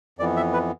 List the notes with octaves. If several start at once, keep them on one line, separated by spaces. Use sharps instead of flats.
F2 E3 B3 D5
E5
B4